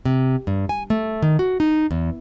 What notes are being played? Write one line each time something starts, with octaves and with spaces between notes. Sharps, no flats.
C3
G2
G#5
A3
D#3
F#4
D#4
E2